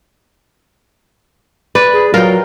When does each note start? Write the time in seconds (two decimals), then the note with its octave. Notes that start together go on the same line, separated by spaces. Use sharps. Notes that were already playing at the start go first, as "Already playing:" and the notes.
1.75 B4 D5
1.93 G#4
2.14 F#3 F4 A#4 G5